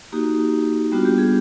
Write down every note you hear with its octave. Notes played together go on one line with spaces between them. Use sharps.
A#3 D#4 F#4 G4
G3 B3 D4 F4 F#4
G4
G#4